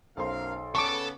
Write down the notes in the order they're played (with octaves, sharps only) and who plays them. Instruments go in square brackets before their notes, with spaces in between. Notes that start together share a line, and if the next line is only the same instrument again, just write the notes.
[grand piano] B1 C5 C6 [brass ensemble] F#2 A#4 F5
[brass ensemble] C#3 B3 [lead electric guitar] A4 A5 [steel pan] C#6 D6